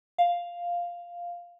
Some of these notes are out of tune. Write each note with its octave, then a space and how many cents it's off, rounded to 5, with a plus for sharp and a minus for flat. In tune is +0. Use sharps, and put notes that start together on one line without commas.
F5 +0